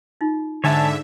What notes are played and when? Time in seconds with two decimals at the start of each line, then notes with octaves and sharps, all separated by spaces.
0.21 D#4 F4
0.64 G#2 D3 C#5 E5 G#5 A5